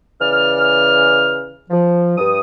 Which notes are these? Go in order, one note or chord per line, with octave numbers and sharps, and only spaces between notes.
C#3 E3 D5 F6
F3
G2 D#6